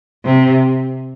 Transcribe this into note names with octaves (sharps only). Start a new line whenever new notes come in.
C3